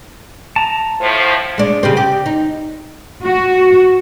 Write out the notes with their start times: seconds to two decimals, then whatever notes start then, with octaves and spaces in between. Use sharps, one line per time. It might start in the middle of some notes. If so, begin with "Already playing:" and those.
0.56 A5 A#5
1.01 A2 F3 C5
1.58 G#3 D4
1.83 C#3 G3 C4
1.97 G4
2.26 D#4
3.25 F#4